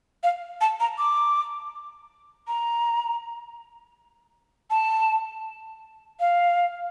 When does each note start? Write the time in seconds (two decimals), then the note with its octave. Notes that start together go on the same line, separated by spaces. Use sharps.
0.23 F5
0.61 A5
0.80 A#5
0.98 D6
2.48 A#5
4.70 A5
6.20 F5